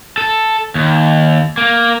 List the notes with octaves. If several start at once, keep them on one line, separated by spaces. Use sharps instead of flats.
A4
D#2
A#3